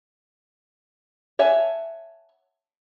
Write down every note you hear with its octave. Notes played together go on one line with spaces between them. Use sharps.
C#5 E5 F#5 G#5 A5